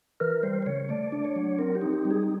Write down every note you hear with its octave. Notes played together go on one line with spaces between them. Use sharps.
E3 A#4
G3 C5
C5
C#3 C#5
A3 D5
D4
C#5
F#3
C4 A#4
G4
D#4
G4
G3
G#4